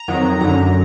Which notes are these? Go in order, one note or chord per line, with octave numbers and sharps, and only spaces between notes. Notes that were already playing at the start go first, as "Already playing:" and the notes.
Already playing: A#5
F2 D#3 F#3
F#2 D3 F#3 A#5